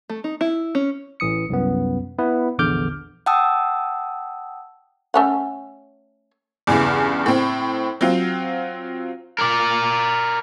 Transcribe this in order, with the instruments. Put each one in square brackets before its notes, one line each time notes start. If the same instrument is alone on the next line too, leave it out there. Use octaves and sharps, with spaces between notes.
[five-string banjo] A3
D#4
E4
C#4
[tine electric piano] A1 E3 D#6 C#7
C2 F#2 B3
B3 E4 B4
A#1 E2 D3 D6 F6 G6
[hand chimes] F#5 G5 A5 D#6 E6
[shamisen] A3 C#4 F#5
[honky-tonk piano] E2 G2 C#3 E3
A2 C4
F#3 C4 F4
[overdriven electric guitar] A#4 D5